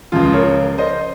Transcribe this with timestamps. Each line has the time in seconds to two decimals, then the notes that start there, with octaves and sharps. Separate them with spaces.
0.12 C#2 C#3 F3 F4
0.33 A#4 C#5
0.78 C5 D#5